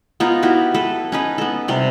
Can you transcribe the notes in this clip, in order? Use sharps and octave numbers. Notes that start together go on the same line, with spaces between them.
B3 D#4 F4 A#4
B3 E4 F#4 G4
A4 B4
C#4 D#4 B4
B3 A4
C3 G3 D5